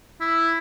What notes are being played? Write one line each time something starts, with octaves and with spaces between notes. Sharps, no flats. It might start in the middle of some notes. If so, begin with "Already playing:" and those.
E4